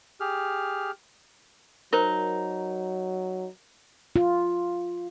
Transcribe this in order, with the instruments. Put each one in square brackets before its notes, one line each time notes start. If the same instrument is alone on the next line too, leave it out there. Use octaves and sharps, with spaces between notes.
[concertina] G4 G#4 F6
[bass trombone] F#3 [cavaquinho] D#4 [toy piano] A#4 C5
[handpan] F4